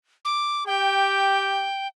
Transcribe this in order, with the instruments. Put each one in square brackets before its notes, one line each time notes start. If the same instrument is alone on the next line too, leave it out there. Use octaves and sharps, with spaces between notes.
[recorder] D6
[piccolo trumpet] G4 [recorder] G5